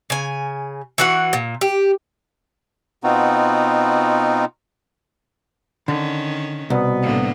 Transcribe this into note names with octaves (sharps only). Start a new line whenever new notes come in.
C#3 G#5
E3 F#4 F#5
A#2
G4
B2 B3 C4 D#4 F4 F#4
D3 D#3 C#4
C2 B2 B3
A2 D3 A#3